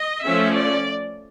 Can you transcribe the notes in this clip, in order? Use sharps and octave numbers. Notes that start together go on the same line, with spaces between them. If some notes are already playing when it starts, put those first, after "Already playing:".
Already playing: D#5
F3 A3 C#4 E5
D5